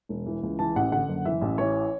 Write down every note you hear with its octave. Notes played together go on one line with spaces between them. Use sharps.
E1
E3
C#2
E3 A5
A1 F#5
D3 F#5
F#1
E3 E5
A1
E3 C#5